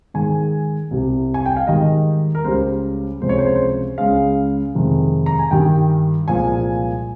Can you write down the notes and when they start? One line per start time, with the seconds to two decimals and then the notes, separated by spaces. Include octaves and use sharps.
0.14 G#2 D#3 G#3 G#5
0.91 C2 C3 G3
1.34 G#5
1.46 G5
1.57 F5
1.67 G#2 D#3 G3 D#5
2.35 A#4
2.44 C#2 C#3 G3 C5
3.21 C#2 C3 F3 G#3 C5
3.29 C#5
3.39 C5
3.47 C#5
3.55 C5
3.98 C#2 C#3 G#3 F5
4.75 F2 C3 D#3 G#3
5.26 A#5
5.39 G#5
5.51 G2 D#3 G3 G5
6.28 C2 A#2 F3 G#3 G#5